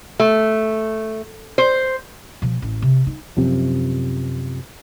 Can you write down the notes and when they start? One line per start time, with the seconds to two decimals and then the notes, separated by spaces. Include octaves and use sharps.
0.20 A3
1.58 C5
2.42 B2 F3
2.62 A1
2.82 C3
3.07 D#4
3.37 F#2 C3 F3